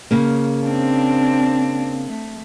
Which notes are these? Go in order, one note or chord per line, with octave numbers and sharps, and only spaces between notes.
C#3 A#3
C4 D4
A3